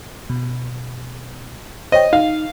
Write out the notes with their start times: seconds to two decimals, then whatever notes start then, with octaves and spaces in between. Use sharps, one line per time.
0.30 B2
1.92 C5 C#5 D#5 G5
2.13 D#4 F5